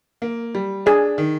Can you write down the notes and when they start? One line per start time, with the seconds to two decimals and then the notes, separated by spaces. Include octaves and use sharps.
0.22 A#3
0.55 G3
0.86 D4 G#4
1.18 D#3